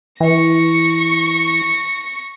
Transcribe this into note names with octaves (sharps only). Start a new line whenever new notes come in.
E3 C#6 A#6